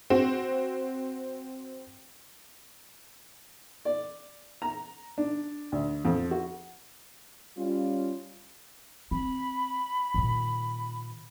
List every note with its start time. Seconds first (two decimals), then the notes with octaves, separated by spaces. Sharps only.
0.10 C4 F#4
3.85 D5
4.62 A#5
5.18 D4
5.72 D2
6.05 F2
6.31 F#4
7.57 G3 C#4 F4
9.11 C4 B5
10.14 A#2 D#3